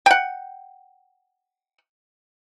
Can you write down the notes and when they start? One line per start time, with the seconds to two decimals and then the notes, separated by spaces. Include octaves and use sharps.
0.06 F#5 G5